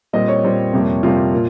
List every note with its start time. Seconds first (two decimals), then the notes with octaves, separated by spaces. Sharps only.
0.13 A#2 G3 C4 D#5
0.28 C#5
0.44 A#2 G3 C4
0.73 F2 C3 G3 A#3
1.03 F2 C3 G3 A#3 F4
1.34 A#2